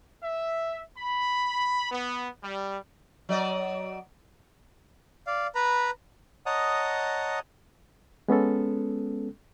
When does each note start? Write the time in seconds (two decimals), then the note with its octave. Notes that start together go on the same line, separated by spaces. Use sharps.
0.22 E5
0.97 B5
1.90 B3
2.43 G3
3.29 F#3 D5 D#5
5.27 D5 F5
5.55 B4 A#5 B5
6.46 C#5 D#5 F#5 A5 A#5 D#6
8.28 G#3 B3 C#4 A4